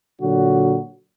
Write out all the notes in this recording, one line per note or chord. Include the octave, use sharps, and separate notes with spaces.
A#2 D3 F#3 F#4